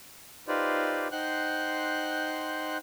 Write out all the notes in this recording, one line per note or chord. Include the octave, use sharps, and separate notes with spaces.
D#4 F4 G4 B4 C5 D5
D#4 C5 F#5 G5 C6 F#6